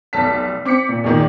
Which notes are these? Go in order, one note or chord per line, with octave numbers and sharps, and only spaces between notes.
F1 B1 A5 B6
C4 D6 B6 C#7
A#2
E2 A#2 D#3